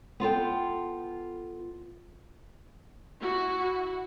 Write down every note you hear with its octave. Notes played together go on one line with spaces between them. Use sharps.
B3 F4 A4 G5
E4 F#4